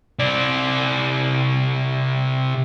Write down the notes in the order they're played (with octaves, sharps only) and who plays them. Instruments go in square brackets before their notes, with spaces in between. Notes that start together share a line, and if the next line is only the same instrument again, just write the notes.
[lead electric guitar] C3 D5